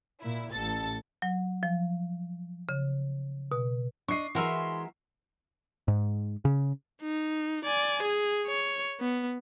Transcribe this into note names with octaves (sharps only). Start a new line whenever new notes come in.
A#2 E4
A1 A4 A6
F#3
F3
C#3
B2
D4 D#5 C#6 C7
E3 G#3 F#4 A#4 E5 C6
G#2
C#3
D#4
D5 G#5
G#4
C#5
B3